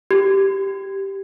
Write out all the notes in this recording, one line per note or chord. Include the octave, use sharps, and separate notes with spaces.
G4